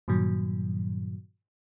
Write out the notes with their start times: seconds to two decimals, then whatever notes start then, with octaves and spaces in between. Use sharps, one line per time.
0.08 G2 A#2 D#3 F#3